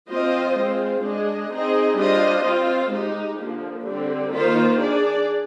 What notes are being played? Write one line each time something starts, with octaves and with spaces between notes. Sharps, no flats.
F3 C4 F4 C5 D#5
G#3 C4 F4 C5
G#3 D4 G#4 D#5
C4 D#4 G#4 D#5
G3 D4 F4 C5 D#5
C4 F4 C5
G#3 D#4 G4
D3 F3 A#3
D3 G3 C4
D#3 A#3 F4 C5
D4 G#4 D5